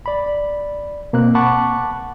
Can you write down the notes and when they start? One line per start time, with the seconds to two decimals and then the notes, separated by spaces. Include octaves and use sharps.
0.06 D5 B5
1.13 B2 A#3 C4 F#6
1.35 F#5 A5 B5 C#6 D6 F#6